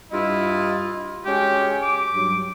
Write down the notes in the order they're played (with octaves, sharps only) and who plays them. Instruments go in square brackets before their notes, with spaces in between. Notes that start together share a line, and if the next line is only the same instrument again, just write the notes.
[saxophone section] G2 F4 D#5 [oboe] E4
[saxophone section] G#3 C#4 F#4 [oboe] G4
[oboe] D6
[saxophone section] G2 F#3